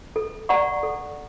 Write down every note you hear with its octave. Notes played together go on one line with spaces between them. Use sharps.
A4
D5 F#5 A#5 C#6
A4